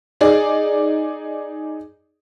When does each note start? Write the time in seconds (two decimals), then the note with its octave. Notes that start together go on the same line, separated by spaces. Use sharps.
0.21 D#4 G#4 D5